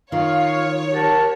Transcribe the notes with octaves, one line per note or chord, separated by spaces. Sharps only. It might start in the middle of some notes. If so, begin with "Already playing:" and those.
D#3 F4 C#5 F5
G4 A#4 F#5 A5